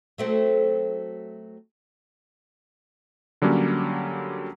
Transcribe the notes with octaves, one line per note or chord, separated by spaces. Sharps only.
F#3 A3 C4
D3 F#3 G3 A#3 C#4